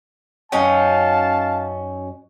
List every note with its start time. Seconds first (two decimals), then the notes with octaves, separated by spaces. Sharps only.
0.52 F#2 F#3 C#4 D#4 F5 G5 A5